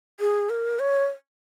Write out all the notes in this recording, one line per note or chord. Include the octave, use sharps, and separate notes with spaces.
G#4
A#4
C#5